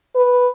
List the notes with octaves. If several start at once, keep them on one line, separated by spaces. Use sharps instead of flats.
B4